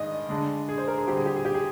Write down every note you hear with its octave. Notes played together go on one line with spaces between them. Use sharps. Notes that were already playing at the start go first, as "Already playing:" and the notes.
Already playing: G2 D#3 G#3 D5 D#5
D3 G#3 D4
G#4
C5
A#4
G#4
D3 G3 C4 G4
G#4
G4
G#4
G4
G#4